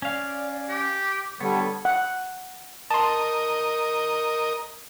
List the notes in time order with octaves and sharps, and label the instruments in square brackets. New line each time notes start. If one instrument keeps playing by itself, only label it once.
[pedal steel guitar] C#4 F5 [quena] D5
[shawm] G4 [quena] D6
[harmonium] D3 G3 [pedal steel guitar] B3 [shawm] C#5
[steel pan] F#5
[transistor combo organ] A#4 D#5 [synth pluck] A5 C6